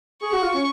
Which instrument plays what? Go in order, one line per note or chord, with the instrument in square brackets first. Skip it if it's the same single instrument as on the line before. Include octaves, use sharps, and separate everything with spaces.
[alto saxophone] G#4 [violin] C#6
[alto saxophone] F#4
F4
C#4